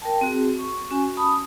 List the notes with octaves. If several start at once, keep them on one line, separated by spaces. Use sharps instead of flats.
A#4 G5 A5
C4 F#4 G#4
C#6
C#4 F#4 G#5
A5 B5 D#6